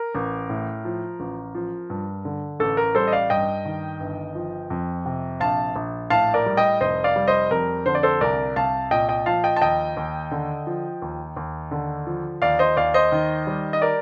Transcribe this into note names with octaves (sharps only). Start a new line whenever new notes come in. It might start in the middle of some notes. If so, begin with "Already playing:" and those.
Already playing: A#4
A1
A2
F3
A1
F3
G2
D3
A1 A4
A#4
G3 A4 C5
D#5
D5 F5
G2 D#5 G5
D#3
G1
F3
F2
C3
A#1 F5 A5
A#1
A2 F5 A5
A#4 D5
G3
D#5 G5
F1 C5 D#5
D5 F5
G3
C5 D#5
F2 A#4
D3 C5
D5
A4 C5
C2 A#4 D5
C2 F5 A5
A#2 D#5 G5
D#5 G5
F3 F5 A5
D#5 G5
A5
D#2 D#5 G5
D#2
D3
F3
D#2
D#2
D3
F3
D#2 D5 F5
C5 D#5
D#2 D5 F5
C5 D#5
D#3
G3
D#5
A#4 D5